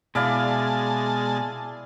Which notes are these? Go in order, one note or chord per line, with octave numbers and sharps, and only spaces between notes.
B2 G#3 E4 D5 F5 A5